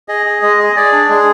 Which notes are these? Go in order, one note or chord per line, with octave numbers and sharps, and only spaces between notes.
G#4 D#5
G#4
G#3 D#5
G#4 D#5
G#4 D5
D4
G#3 G#4